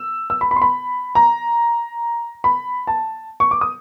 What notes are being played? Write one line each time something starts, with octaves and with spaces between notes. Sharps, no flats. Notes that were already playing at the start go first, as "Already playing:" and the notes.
Already playing: E6
E6
B5
B5
C6
B5
A#5
B5
A5
C#6
D6
D#6